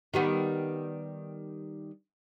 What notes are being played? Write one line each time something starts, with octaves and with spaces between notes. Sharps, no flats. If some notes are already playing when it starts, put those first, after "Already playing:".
D#3 G3 B3